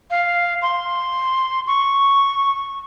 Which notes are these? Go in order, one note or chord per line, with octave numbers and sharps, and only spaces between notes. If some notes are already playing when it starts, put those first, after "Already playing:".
F5
C6
C#6